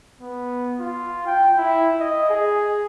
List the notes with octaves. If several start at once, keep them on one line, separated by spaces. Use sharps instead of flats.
B3
F4
G5
E4
D#5
G#4